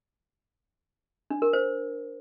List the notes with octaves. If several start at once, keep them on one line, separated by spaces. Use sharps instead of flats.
D4
A#4
C5